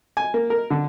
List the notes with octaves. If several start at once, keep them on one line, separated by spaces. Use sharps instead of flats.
G#5
A#3
A#4
D3